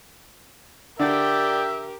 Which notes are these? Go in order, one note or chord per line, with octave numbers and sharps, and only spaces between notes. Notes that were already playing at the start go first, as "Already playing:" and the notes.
D3 G4 A#4 D5 E5 G5